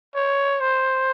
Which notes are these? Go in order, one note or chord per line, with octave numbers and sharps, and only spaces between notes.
C#5
C5